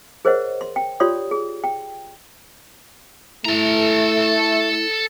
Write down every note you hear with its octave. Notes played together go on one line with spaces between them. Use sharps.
G#4 A#4 C5 C#5 D#5 F#5
C6
G5
F4 G4 C#5 D5 C6 D#6
G#4
G5
A3 E4 A4 A#5